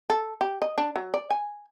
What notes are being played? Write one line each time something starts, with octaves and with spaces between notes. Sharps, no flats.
A4
G4
D#5
D4
F#3
D5
G#5